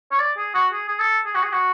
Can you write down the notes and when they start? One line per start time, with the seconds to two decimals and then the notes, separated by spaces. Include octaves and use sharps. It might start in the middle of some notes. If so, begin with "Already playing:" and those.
0.12 C#5
0.19 D5
0.37 G#4
0.55 F#4
0.73 G#4
0.89 G#4
0.99 A4
1.26 G#4
1.35 F#4
1.43 G#4
1.52 F#4